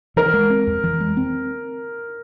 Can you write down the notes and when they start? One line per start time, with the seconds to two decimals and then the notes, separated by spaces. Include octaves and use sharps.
0.16 E3 A#4
0.34 G#3
0.50 C4
0.67 F2
0.84 E3
1.00 G#3
1.17 C4